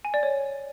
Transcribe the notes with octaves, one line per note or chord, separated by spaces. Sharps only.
G#5
D5
C#5